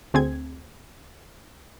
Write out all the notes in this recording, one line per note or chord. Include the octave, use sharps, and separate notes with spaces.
D2 C4 G#4 G#6